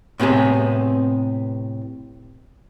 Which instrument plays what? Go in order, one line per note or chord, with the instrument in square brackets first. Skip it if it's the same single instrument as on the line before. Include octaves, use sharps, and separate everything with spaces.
[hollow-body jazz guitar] A2 C3 B3 G#4